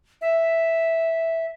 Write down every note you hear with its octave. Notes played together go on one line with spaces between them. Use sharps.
E5